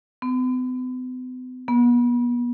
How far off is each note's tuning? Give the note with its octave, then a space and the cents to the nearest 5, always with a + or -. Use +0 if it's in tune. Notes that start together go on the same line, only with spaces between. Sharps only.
B3 +45
B3 -35